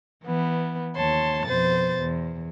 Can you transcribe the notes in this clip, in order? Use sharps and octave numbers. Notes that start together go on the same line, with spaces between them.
E3 B3
D#2 C#5 A5 C6
F2 B2 C5 A6
E2